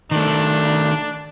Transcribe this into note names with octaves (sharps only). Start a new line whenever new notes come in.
D#3 A3 D4